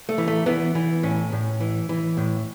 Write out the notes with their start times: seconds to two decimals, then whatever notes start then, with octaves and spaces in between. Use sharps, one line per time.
0.09 A3
0.18 E3
0.28 A3
0.46 E3 B3
0.75 E3
1.03 A2 C#4
1.33 A2
1.61 E3
1.89 E3
2.17 A2